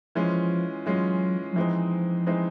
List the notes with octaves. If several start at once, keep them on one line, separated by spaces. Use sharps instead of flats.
E3 F3 G#3 C#4 F4
E3 F#3 G#3 C#4 F4
F#3
E3 F3 G#3 C4 D#4
E3 G#3 C4 D#4